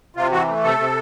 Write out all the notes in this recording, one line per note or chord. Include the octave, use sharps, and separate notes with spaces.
C3 F4
E3 F#4
A3
C3 A4
C3